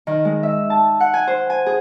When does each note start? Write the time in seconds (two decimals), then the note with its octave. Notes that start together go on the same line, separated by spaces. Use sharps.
0.07 D#3
0.25 G#3
0.43 E5
0.70 A5
1.00 F#5
1.14 G#5
1.27 C5
1.50 G#5
1.66 G#4